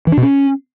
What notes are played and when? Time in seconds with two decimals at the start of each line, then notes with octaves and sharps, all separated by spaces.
0.07 E3
0.12 D4
0.17 B2
0.23 C#4